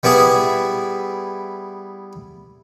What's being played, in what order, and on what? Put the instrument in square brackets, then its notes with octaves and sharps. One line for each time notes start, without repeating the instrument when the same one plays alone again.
[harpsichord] G3 B3 E4 G#4